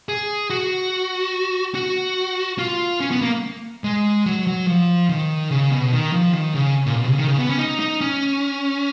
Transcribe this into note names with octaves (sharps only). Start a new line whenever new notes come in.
G#4
F#4
F#4
F4
C#4
B3
A#3
G#3
F#3
F#3
F3
D#3
C#3
B2
D#3
F3
D#3
C#3
A#2
B2
C#3
D#3
C#3
B3
C#4
D#4
D#4
C#4